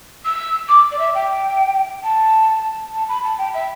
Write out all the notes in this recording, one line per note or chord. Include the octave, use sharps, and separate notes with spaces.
E6
D6
D5
E5
G5
A5
A5
B5
A5
G5
E5